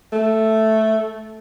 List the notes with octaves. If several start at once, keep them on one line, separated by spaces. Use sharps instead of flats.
A3